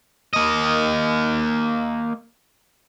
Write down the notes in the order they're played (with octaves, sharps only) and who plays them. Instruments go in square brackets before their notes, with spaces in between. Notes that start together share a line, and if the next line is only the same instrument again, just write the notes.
[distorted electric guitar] A#3 D#5